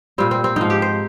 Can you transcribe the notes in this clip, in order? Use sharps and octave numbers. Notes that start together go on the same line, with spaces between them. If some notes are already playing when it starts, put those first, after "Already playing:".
A#2 G3 C4
C4
C4
G#2 F3 D#4
G4
C5